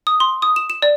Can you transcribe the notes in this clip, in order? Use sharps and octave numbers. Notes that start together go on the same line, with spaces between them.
D#6
C6
D#6
E7
E7
D5